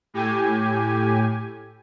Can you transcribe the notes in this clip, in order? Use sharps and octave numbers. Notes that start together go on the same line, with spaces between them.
A2 G4 G#5